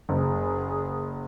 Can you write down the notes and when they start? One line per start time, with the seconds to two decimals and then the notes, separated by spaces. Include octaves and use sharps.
0.09 F#1 G#4